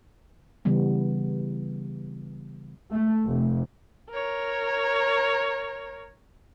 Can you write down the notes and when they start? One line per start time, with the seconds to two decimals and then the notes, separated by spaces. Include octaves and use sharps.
0.65 C#3 E3 G3 B3
2.91 A3
3.25 F1
4.11 A#4 C#5